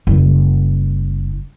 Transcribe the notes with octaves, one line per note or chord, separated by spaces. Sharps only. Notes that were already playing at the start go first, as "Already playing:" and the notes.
F#1 G3